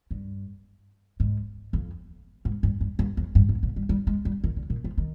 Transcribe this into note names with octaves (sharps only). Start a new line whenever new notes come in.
G2
G#2
F2
G#2
G2
G2
G2
F2
G2
G#2
A#2
G3
G3
G#3
G3
D#3
D3
A#2
F3
D#3